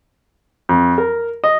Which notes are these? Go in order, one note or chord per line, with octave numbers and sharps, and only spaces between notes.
F2
A#4
D#5